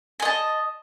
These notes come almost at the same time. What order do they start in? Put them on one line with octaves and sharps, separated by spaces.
G#5 D#5 A5